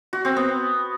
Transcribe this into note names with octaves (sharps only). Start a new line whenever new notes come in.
F#4
C4
B3